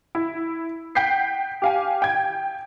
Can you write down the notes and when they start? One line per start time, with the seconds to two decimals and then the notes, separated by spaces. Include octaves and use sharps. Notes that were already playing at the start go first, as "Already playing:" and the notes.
0.15 E4
0.95 F#5 G5 G6 B6 C7
1.62 G4 F5 G#5
2.02 G5 G#6